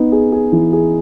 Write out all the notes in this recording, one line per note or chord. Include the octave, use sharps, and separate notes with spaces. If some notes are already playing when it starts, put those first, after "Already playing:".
Already playing: B3 D#4
G#4
G#4
E3
G#4